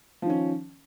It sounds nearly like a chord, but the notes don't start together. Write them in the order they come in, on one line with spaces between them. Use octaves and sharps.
F3 D#3 C#4